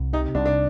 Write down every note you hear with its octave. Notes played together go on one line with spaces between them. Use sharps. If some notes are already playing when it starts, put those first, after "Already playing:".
Already playing: C2
C3 D#4
C2 D4
D4